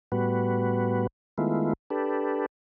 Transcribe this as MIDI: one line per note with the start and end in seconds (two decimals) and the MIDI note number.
0.12 1.07 45
0.12 1.07 55
0.12 1.07 59
0.12 1.07 66
0.12 1.07 71
1.38 1.73 51
1.38 1.73 56
1.38 1.73 57
1.38 1.73 59
1.38 1.73 64
1.38 1.73 65
1.90 2.46 62
1.90 2.46 67
1.90 2.46 69
1.90 2.46 71